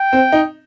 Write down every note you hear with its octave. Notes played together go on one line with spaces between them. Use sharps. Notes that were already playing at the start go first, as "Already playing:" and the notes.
Already playing: G5
C4
D#4